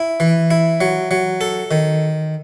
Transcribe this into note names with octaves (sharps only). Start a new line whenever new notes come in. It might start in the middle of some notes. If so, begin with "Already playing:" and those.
Already playing: E4
E3
E4
F#3
F#3
A4
D#3